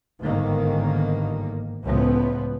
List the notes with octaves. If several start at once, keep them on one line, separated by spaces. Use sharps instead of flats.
G1 G#2 D#3 A#3
C#2 A2 F3 B3